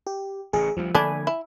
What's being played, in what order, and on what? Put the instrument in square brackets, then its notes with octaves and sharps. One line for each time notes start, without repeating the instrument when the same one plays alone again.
[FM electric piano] G4
[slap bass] A1 A2 C#3 [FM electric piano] G#4
[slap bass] D2 G3 [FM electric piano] F3
[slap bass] D3 F3 A#3 [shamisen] A3 D4 [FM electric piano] G#5 B5
[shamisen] E4